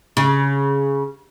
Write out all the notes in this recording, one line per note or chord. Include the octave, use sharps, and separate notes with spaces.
C#3